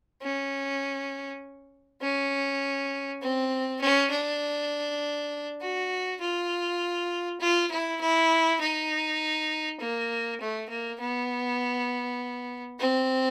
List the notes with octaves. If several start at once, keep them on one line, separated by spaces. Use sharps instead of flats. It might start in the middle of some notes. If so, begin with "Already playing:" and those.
C#4
C#4
C4
C#4
D4
F#4
F4
F4
E4
E4
D#4
A#3
A3
A#3
B3
C4